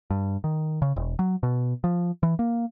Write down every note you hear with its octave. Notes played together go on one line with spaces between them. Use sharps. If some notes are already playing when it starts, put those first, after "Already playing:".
G2
D#3
C#3
E1
F#3
B2
F3
E3
A#3